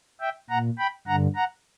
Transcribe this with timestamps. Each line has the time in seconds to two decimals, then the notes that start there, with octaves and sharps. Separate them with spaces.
0.21 E5 G5
0.49 A#2 F#5 A#5
0.78 G5 B5
1.07 G2 D3 F#5 A#5
1.35 F#5 A#5